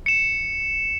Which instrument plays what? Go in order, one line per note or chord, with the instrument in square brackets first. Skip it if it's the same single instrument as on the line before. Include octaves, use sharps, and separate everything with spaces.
[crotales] C#7 E7